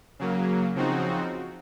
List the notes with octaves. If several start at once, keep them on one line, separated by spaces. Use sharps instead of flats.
C#3 F#3 A#3
C#3 F3 C4 D#4 F#4